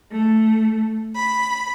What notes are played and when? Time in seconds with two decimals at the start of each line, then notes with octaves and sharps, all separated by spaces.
0.12 A3
1.15 B5